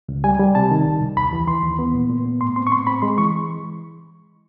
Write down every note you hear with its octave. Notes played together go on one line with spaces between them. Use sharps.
C#2
G3 G#5
G3
C3 A5
D#3
C2
C2
D#2 B5
E3
E3 C6
D#2
B3
A#2
A#2
B3
A2 C6
C4 C6
C#6
A2 C6
C4 B5
G#3 C6
E3 C#6